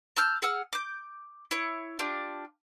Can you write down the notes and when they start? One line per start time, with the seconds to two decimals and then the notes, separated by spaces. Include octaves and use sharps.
0.16 A5 E6 F6 G6
0.42 G#4 F#5 E6 F6
0.73 D6 G6
1.51 E4 C#5
1.99 D4 F4 G4